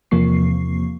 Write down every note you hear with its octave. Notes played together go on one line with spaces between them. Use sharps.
E2 C3 F3 A#3 C#6 C7